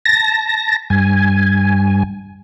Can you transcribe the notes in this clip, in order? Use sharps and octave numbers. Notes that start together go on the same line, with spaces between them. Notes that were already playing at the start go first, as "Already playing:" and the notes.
A5 A#6
G2 G#5